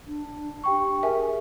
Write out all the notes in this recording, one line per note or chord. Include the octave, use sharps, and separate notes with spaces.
D4
G4 G5 C#6
G#4 A#4 E5 G#5